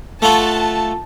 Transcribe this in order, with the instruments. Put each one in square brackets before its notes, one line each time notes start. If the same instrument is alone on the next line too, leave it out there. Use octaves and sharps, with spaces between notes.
[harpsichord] A3 F4 F#4 [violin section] A5